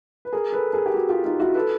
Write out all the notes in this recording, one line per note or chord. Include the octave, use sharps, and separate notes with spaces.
B4
G#4 A#4
A4 B4
G#4 A#4
G4
F#4 G#4
F4 G4
D#4 F4
E4 F#4
A4 B4